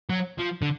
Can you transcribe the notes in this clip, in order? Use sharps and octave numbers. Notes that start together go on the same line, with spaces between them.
F#3
F3
D3